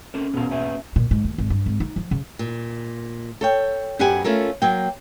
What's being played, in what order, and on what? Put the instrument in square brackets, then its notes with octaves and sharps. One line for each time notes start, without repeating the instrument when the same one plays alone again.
[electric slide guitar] C4 A4 A#4 [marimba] C#4
[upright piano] E1 B1 [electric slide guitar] B3 A#4
[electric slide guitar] A#3 B4 G#5 [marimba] E5
[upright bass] A#2
G#2
D#2
G#1
G2
G#1
D#4
F3
C#3
[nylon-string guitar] A#2
A4 C#5 G5
F#2 B3 G4 D5 F#5 G#5
A3 C#4 F4 A4 A#4
F#3 A#3 G5